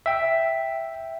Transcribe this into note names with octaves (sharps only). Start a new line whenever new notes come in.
E5 G5